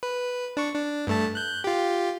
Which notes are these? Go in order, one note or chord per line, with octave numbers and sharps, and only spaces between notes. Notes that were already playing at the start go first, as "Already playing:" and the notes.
B4
D4 C#6
D4
G2 A3 A5
F#6 G6
F4 G4